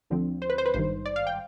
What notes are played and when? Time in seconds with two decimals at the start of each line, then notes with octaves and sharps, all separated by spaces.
0.10 D2 D3 F3 C4
0.42 C5
0.50 B4
0.58 C5
0.66 B4
0.74 G#1 G2 D#3 C5
1.06 D5
1.16 F5
1.27 G5